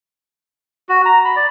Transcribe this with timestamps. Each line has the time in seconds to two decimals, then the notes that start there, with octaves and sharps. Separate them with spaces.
0.89 F#4
1.05 A#5
1.25 B5
1.36 D5